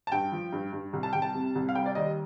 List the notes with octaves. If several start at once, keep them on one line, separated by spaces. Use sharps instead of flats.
A5
G2 G5
F3
G2
G2
C2
A5
C2 G5
A5
C3
C2
F5
G3 G5
D5
D#2 D#5